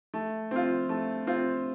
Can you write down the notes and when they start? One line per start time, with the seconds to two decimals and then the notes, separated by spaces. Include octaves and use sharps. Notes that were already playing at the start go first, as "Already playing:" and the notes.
0.14 A3
0.51 C4 F4
0.89 A3
1.27 C4 F4